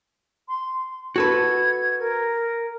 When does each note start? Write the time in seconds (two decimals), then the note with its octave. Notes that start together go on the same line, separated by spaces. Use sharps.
0.48 C6
1.16 F#4 A4 B4 G#6
1.99 A#4